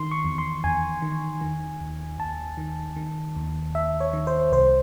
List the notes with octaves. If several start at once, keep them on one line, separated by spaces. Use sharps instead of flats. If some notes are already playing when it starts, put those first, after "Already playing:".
Already playing: D#3 C6
C#6
E2
C6
E2 G#5
D#3
D#3
D#2
D#2 A5
D#3
D#3
D#2
D#2 E5
C#5
D#3
C5
C2 C5